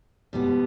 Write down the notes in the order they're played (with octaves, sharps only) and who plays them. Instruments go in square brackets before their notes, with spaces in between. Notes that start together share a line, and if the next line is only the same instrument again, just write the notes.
[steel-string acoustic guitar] B2 G3 B3